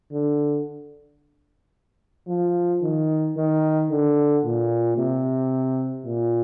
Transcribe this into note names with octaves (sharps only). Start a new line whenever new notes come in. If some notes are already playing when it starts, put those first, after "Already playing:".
D3
F3
D#3
D#3
D3
A#2
C3
A#2